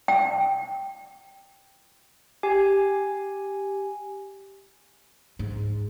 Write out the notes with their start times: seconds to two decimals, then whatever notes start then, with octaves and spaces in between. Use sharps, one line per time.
0.08 G5
2.43 G4 G#5
5.39 G#2